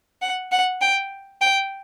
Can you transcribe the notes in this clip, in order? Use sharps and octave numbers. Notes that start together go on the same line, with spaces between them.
F#5
F#5
G5
G5